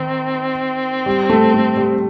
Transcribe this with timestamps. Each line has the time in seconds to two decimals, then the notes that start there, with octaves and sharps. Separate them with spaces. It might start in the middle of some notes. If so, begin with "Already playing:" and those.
Already playing: D#3 C4
1.06 G3
1.29 A3
1.54 A3
1.77 G3